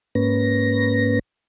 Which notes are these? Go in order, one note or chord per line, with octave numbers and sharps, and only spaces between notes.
G#2 A#3 C#4 B4 A#6